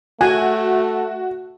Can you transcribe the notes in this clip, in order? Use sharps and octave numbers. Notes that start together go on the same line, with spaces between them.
A3 F#4 G#5